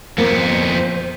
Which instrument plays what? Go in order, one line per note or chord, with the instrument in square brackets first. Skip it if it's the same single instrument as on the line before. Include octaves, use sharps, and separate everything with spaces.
[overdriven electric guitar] F2 B3 [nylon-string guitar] A#3 [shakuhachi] C5